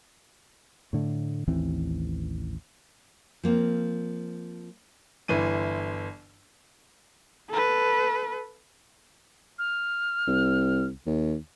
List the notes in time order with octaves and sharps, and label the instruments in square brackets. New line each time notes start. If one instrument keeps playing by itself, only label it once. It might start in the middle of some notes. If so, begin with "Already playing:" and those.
[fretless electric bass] A2 D3 A3
A1 D#2 E3 C4
[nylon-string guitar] F3 A#3 C4
[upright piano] G1 E3 D#7
[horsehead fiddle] A4 B4
[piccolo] F6
[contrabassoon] C2
D#2